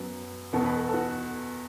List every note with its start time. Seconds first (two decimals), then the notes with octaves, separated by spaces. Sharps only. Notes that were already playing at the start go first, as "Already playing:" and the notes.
Already playing: F#2 F#3 B3
0.53 E2 B2 B3 A4
0.65 B4
0.76 A4
0.88 A4
0.94 F#4